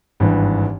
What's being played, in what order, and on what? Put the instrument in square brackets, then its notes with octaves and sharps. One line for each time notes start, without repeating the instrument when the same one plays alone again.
[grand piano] G#1 G2 E3